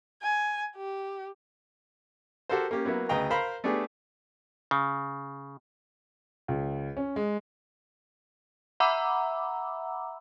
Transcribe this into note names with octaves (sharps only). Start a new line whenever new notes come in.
G#5
G4
F#4 G4 A4 A#4 C5
A#3 C#4 G4
F#3 A#3 B3 E4
D2 C#3 B4 D#5 G5 A#5
A#4 C5 F5 A#5 B5
A3 B3 D4 G4 G#4
C#3
C#2
C#4
G#3
E5 F#5 A#5 B5 D6 E6